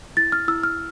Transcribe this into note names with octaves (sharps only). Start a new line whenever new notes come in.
E4 A6
F6
E4 E6
F6